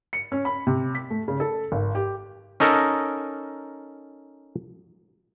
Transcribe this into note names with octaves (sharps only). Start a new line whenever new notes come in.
C#7
C#4
B5
C3
B6
A3
C#3
A4
G#1
G4
C#4 D#4 A4 A#4